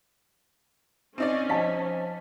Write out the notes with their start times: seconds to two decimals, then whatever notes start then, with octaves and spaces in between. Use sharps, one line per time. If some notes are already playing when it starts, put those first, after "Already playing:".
1.18 C4 C#4 D#4 D5
1.49 F3 D#5 G#5 A5 B6